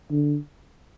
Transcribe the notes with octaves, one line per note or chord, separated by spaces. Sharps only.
D3